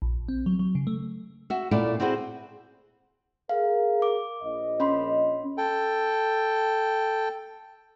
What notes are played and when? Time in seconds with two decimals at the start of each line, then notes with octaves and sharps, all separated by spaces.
0.02 A#1
0.28 C4
0.46 F#3
0.59 F#3
0.75 C#3
0.87 A3
1.50 F#4 E5
1.71 A#2 A3 C#4 E4 D5
2.00 C4 E4 F#4 G#4 C5
3.49 G#4 A#4 F5
4.02 D6
4.42 A#1 D#5
4.80 C#4 B5 C6
5.58 A4 G5